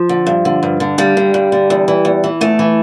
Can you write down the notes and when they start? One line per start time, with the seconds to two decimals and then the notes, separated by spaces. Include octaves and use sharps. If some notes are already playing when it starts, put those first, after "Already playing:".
Already playing: F3
0.09 D3
0.27 G2
0.45 D3
0.63 G2
0.80 D3
0.98 G2 G3
1.17 D3
1.34 G2
1.52 D3
1.70 E2
1.88 E3
2.05 E2
2.24 E3
2.41 E2 A3
2.59 E3